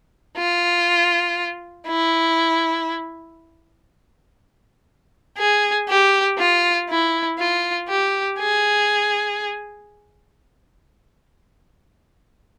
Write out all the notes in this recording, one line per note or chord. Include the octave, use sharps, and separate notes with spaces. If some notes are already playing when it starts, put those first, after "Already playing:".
F4
E4
G#4
G4
F4
E4
F4
G4
G#4